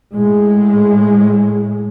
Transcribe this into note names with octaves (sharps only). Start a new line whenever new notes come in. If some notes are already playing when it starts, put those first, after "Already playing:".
A2 G#3